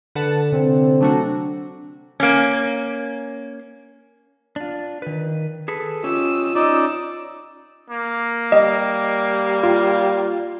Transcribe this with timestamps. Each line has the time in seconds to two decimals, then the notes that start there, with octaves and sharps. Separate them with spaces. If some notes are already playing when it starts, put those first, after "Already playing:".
0.15 D3 B4 F#5 A5
0.52 C3 C4
1.01 F#3 A3 D4 F#4
2.20 A#3 C#4
4.56 D4 F4
5.02 D#3 B4
5.68 G#4 A4 B4
6.04 C#4 F4 G4 D#5 E6
6.55 C#4 D#4 D5
7.90 A#3
8.52 G3 D#5
9.63 F4